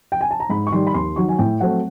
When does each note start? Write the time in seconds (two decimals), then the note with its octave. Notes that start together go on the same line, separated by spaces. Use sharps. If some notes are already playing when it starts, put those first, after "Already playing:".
0.12 G5
0.21 G#5
0.31 A5
0.40 A#5
0.50 G#2 B5
0.67 C#6
0.72 D#3 G3 C6
0.87 B5
0.94 D#2 C6
1.16 D#3 F#3 C#6
1.29 G#5
1.38 A2 G5
1.60 F#3 A3 C4 F#5